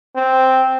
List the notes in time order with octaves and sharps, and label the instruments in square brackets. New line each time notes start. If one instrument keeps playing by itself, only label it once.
[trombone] C4